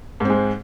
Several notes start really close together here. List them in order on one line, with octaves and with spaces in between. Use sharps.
G#2 C4 G#3